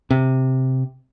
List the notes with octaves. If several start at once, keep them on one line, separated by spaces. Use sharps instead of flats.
C3